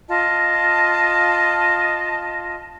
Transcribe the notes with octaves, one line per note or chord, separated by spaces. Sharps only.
F4 D#5 A5